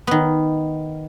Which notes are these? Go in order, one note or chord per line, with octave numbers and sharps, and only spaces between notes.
D#3 B3